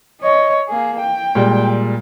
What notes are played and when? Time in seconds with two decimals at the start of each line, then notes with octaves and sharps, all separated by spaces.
0.21 C#5 D#5
0.68 A#3 G#4
1.00 G5
1.35 A#2 G3 G#3